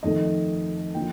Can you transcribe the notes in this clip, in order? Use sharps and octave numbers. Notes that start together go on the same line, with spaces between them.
F2 D#3 A3 D#5
D3 F3 A#3 G5